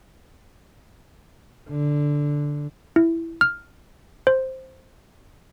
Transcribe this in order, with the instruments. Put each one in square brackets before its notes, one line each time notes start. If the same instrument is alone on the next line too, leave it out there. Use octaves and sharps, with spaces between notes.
[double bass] D3
[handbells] E4
F6
C5